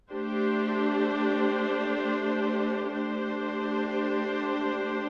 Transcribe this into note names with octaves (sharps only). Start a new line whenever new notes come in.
A3 D4 G4 C5
A3 D4 G4 C5